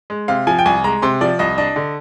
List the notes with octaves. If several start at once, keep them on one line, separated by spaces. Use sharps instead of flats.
G#3
C3 F5
F3 G#5
G5
C2 G#5
G#3 A#5
C3 C6
F3 D5
C2 D#5
D4 D#5
D3